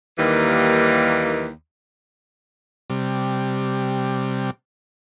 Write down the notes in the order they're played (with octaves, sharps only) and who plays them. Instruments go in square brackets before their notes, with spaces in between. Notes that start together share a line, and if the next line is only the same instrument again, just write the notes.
[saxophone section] D#2 D#3 E3 G3 A#3
[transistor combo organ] C3 G3